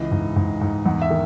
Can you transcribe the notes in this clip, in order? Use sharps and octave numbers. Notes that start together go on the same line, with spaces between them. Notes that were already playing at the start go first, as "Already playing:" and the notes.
Already playing: C#2 E3 D#5
G#2
G#2
G#2
E2 F#5
E5
D#3